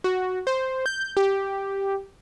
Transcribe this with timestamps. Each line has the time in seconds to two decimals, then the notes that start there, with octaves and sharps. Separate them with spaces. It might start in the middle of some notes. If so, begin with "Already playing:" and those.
0.04 F#4
0.47 C5
0.86 G6
1.17 G4